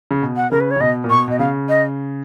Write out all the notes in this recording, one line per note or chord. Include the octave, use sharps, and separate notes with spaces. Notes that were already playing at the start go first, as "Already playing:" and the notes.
C#3
B2
F#5
C#3 A#4
B4
C#5
C#3
B2 D#5
A#2
B2 C#6
B2 D#5
C#3 F5
D#5